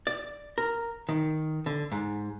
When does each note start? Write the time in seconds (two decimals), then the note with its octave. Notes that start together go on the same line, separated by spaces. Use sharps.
0.07 D5
0.58 A#4
1.09 D#3
1.66 D3
1.92 G#2